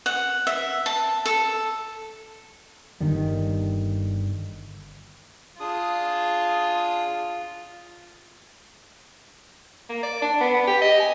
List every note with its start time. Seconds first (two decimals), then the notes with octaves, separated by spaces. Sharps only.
0.06 F#5
0.47 E5
0.86 A5
1.25 A4
3.01 G1 D3 D#3 G3
5.60 D4 F4 G#4 D#6
9.89 A#3
10.03 D5
10.22 D4
10.40 B3
10.54 B3
10.67 G4
10.82 D#5
11.00 G#5